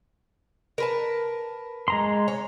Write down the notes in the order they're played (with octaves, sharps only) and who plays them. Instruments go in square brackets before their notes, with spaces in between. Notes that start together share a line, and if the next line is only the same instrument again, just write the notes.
[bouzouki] A#4 B4 A5
[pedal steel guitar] G#3 A#5 C6
[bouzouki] C#5